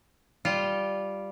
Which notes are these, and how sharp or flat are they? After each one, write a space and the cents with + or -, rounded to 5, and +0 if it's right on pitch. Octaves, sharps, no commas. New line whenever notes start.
G3 +0 F4 -10